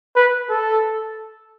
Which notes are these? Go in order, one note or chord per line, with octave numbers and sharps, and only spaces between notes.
B4
A4